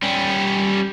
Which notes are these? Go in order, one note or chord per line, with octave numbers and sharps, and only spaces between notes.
G3 C#4